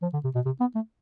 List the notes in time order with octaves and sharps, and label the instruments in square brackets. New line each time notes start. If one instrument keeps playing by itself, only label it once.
[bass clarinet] F3
D3
C3
B2
C3
B3
A3